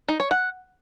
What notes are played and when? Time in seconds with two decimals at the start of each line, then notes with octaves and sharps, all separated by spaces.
0.08 D#4
0.20 C#5
0.31 F#5